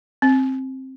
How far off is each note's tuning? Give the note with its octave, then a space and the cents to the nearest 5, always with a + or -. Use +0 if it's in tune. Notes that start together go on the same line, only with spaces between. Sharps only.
C4 +15